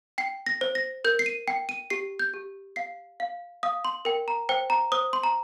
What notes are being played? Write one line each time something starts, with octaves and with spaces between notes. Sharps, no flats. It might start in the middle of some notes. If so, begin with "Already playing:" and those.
G5 C7
A#6
C5
A#6
A#4 G6
C7
D#7
G5 C7
D#7
G4 C7
G6
G4
F5 C7
F5
F5 D#6
C6
A#4 G5
A#5
C5 G5
A#5
C5 D#6
C6
A#5